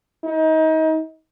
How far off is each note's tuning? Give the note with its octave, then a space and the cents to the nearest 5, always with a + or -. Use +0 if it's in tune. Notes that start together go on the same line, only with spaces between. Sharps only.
D#4 +30